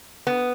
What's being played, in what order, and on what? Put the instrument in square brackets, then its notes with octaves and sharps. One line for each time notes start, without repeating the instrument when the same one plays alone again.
[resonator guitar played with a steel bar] B3